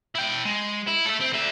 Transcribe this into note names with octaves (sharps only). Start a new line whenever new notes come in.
E4 G5
G#3
E4
A4 E5
C4
D3 E5